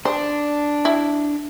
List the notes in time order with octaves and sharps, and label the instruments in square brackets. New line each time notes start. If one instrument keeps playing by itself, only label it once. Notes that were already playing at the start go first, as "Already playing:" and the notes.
[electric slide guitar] D4 [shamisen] C5
[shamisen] E4